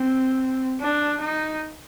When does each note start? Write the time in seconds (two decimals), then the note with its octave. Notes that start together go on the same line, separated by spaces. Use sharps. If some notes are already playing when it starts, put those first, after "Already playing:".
Already playing: C4
0.81 D4
1.21 D#4